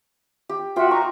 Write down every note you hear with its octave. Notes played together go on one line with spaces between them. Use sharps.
G4
F4 F#4 E5 G5
D#4 A#5 C#6